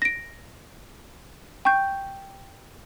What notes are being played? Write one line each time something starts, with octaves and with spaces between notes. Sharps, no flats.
A#6 D7
G5 C#6 G6